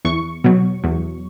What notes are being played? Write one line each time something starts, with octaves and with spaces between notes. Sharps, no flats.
E2 C#6
B2 F#3
E2